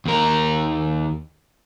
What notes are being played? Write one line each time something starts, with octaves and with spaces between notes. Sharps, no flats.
D#2 A#4